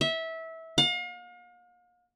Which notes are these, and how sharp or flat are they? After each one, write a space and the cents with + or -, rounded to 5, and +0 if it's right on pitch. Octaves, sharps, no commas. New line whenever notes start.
E5 -20
F5 +40